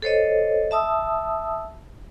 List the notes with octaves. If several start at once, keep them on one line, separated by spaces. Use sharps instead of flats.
A4 C5 C#5 D#5
E5 A5 D#6 E6